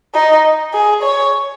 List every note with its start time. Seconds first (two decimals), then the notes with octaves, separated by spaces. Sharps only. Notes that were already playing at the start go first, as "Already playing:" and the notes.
0.14 D#4
0.73 G#4
1.02 C#5